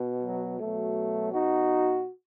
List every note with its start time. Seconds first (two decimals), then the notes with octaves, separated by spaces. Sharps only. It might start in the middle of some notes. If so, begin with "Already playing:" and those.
Already playing: B2
0.23 F#3
0.59 B2 F#3 A3
1.33 D#4 F#4